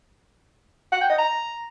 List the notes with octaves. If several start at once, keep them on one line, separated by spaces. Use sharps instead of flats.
F#5
G5
D#5
A#5